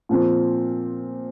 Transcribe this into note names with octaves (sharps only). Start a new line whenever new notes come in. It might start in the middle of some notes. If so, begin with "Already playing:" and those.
A#2 F3 C4